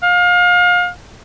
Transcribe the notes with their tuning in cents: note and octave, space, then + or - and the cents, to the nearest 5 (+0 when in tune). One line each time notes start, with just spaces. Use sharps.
F5 +30